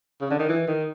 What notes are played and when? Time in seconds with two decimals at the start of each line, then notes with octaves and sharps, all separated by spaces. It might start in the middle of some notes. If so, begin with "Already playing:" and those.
0.21 C#3
0.30 D3
0.39 D#3
0.49 E3
0.67 D#3